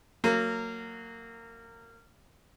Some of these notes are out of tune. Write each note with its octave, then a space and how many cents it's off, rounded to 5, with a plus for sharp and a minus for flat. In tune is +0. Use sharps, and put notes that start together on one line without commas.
F#3 -5 A#3 -25